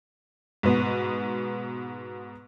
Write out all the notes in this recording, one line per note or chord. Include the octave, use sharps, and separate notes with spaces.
G#2 B2 B3